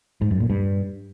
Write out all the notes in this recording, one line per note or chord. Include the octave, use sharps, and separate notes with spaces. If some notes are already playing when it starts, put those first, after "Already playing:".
G#2
F#2
A#2
G2